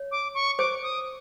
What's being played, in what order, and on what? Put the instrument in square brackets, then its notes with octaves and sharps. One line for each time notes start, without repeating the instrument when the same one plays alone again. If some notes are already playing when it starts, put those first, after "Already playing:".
Already playing: [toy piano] C#5
[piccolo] D6
C#6
[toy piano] C5 [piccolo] D6
[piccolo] D#6